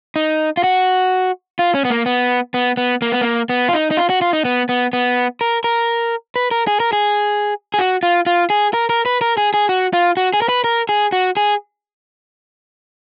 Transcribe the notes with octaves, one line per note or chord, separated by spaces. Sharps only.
D#4
F4
F#4
F4
C#4
B3
A#3
B3
B3
B3
A#3
B3
A#3
B3
F4
D#4
D#4
F4
F#4
F4
D#4
B3
B3
B3
A#4
A#4
B4
A#4
G#4
A#4
G#4
G#4
F#4
F4
F4
G#4
A#4
A#4
B4
A#4
G#4
G#4
F#4
F4
F#4
G#4
A#4
B4
A#4
G#4
F#4
G#4